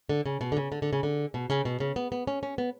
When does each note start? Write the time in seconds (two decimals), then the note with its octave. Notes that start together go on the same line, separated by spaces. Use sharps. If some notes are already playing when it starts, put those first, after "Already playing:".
0.09 D3
0.26 C#3
0.41 B2
0.52 D3
0.57 C#3
0.72 D3
0.82 D3
0.93 C#3
1.03 D3
1.34 B2
1.50 C#3
1.65 B2
1.80 C#3
1.96 B3
2.12 B3
2.27 C#4
2.43 C#4
2.58 B3